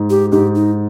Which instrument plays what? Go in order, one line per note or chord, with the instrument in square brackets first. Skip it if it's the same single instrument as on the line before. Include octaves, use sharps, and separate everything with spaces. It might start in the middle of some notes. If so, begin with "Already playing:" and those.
Already playing: [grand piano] G#2
[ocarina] G4
[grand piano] G#2 [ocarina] G4
[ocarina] D#4